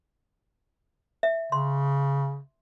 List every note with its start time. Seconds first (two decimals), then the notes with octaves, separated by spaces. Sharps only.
1.23 E5
1.52 C#3 C6